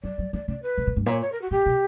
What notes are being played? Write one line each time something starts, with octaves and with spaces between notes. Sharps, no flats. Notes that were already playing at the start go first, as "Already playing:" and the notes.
F#3 D5
F#3
E3 D5
C#3 D5
B4
B2
A#2
G2
A#2 C#5
C#5
A#4
F#4
A#2 G4
B2